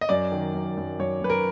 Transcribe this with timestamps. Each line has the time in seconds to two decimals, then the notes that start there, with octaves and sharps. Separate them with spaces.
0.01 D#5
0.09 F#2 D5
0.32 D#3
0.54 F#2
0.77 F#2
0.99 F#2 C#5
1.22 F#2 B4
1.30 A#4